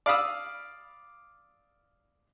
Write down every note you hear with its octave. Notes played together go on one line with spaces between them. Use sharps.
D5 F5 B5 D#6 E6